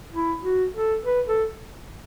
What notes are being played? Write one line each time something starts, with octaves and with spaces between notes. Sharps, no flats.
E4
F#4
A4
B4
A4